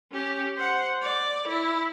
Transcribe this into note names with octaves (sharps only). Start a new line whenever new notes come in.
C#4 G4
C5 F#5
D5
E4